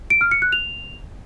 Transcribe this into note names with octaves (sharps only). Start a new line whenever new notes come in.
D7
F6
C#7
F#6
F7